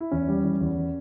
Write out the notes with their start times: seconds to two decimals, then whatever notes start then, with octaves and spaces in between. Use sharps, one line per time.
0.01 E4
0.11 E2 C#4
0.28 G3
0.44 E3
0.61 E2